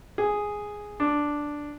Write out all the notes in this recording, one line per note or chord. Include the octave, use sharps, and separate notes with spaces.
G#4
D4